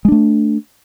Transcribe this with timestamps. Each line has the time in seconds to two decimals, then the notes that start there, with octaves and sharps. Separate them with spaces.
0.05 G#3
0.08 D4
0.12 A3